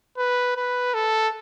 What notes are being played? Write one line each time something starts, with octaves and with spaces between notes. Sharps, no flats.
B4
B4
A4